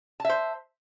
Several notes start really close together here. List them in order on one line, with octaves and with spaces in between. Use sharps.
A5 E5 C5